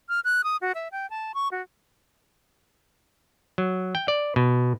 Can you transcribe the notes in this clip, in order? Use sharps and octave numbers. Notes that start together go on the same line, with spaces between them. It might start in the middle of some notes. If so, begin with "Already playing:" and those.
F6
F#6
D#6
F#4
E5
G5
A5
C#6
F#4
F#3
G5
D5
B2